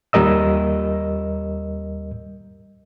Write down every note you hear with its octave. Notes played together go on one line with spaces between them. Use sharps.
D#2 G3 A#4 D#5 E6